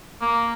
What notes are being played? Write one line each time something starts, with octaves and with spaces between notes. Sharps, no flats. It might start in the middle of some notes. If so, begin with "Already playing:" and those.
A#3